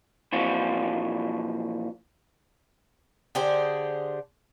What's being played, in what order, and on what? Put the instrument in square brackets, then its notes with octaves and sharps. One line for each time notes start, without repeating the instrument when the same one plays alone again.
[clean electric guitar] A#2 E3 F3 C4 F4 F#4
[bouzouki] D3 G4 G#4 C5